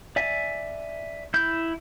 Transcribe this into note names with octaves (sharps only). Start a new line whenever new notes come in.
D5 E5 G#5
E4 G6